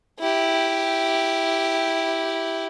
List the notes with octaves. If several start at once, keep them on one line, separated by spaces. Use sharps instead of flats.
E4 G4